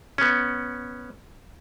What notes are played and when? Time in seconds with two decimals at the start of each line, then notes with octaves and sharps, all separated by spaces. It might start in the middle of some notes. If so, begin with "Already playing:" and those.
0.18 B3 C#4